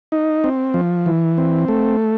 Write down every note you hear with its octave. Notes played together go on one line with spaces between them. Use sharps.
D#4
C4
F3
E3
C4
A3